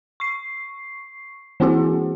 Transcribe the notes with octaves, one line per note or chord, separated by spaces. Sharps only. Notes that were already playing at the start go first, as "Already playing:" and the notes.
C#6 C7
E3 A#3 C4 E4 F#4 G#4